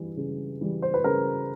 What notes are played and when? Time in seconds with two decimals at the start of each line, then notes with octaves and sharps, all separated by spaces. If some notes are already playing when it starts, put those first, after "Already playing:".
Already playing: E3 G3
0.17 C#3
0.61 E3 G3
0.82 C5
0.94 B4
1.04 C#3 A#4